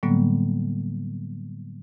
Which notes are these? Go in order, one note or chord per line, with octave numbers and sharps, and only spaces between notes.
A2 D3 F#3 G3 A#3 B3